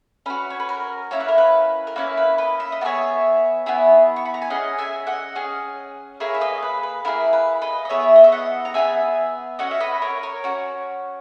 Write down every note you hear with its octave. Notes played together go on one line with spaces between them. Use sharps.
C#4 F#4 B4
C#5
B4
A#4
A#3 C#4 E4 C#5
B4
A#4
B4
A#4
A#3 C#4 E4 B4
B4
B4 D#5
E5
D#5
B3 E4 G#4 C#5 E5
B3 E4 G#4
C#6
B5
A#5
G#5
C#4 G#4 D#5 F#5
E5 G#5
D#5 F#5
C#4 G#4
A#3 E4 G#4 C#5 E5
E5
B4 D#5
B4
B4
A#3 E4 G#4 A#4
B4
B4 D#5
D#5
B3 E4 G#4 C#5 E5
D#5
E5
D#5 F#5
A#5
B3 E4 G#4 E5 G#5
C#4 F#4 D#5 F#5
E5
B4 D#5
A#4 C#5
A#4 C#5
C#4 F#4